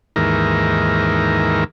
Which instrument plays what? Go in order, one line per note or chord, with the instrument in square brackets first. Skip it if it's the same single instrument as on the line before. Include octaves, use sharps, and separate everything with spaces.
[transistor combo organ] D#2 G#2 E3 A#4